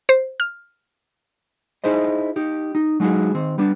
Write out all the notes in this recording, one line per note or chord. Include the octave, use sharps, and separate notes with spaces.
C5
F6
D#4 E4 G#4 C5 D#5
D#4 G4
D#4
F#3 G#3 D#4 F#4 G#4
D#3 C4
G3 B3 D4